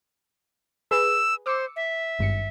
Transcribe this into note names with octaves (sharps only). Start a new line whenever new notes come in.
G#4 B4 E6
C5 D6 E6 C#7
E5
G#1 G2 C#7